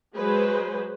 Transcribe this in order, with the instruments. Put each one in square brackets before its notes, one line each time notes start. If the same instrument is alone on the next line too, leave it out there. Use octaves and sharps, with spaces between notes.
[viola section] F#3 G#3 G#4 B4 C5